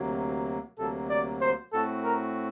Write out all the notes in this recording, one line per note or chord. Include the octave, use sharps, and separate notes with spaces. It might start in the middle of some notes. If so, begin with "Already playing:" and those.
Already playing: D2 C3 F#3 A#3
D2 C3 F#3 A#3 A4
D5
C5
A2 A3 C4 F#4 A4
A#4